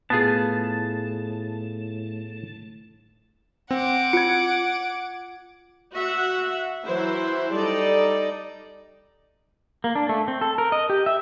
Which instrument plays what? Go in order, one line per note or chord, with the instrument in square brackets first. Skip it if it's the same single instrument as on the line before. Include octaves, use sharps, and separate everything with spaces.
[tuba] A2 [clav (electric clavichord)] B3 F4 G#4 [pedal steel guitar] A5
[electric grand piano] C4 [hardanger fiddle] F#5 D6
[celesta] F4 [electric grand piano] G#6 C#7
[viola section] F#4 E5 F#5
E3 F#3 E4 C5
G3 D#4 A4 D5
[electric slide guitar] A#3
D4
A3
C4
A4
A#4
D#5
G4
E5